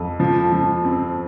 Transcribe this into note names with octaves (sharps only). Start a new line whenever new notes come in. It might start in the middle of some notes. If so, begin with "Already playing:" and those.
Already playing: F2
F3
F3
C4